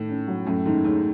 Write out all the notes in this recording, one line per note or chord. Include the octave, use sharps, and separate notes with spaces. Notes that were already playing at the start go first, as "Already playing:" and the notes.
Already playing: A2 D#3 A3
C#4
F#3
F#2 A3
G#2 D#3
G#2 C#4